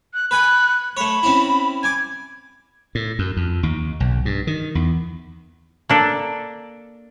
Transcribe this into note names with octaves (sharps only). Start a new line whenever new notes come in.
F#6
B4 G#5 B5 F#6
A3 C#5 B5
C4 C#4 E4
G#5 D6 G#6
A2
F#2
F2
D#2
B1
G2
D#3
E2
A#3 D4 A4